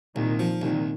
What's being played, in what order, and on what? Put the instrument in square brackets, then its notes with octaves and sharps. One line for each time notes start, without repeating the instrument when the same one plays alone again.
[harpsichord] C2 [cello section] A#2 D#3
[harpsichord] F3
[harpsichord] C2 [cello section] A#2 D#3